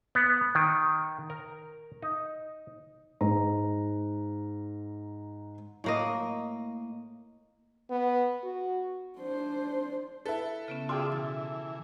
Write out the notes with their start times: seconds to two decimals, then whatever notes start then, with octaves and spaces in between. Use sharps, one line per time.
0.15 B3
0.55 D#3
1.30 A#4
2.02 D#4
3.21 G#2 A#5
5.84 A2 A#3 D#5
7.90 B3
8.44 F#4
9.19 D4 C5
10.25 E4 A4 B4
10.68 C#3 B3 C#4
10.89 F4 F#4 G#4 D5 E5 G5 C6
11.12 B2 E3 A6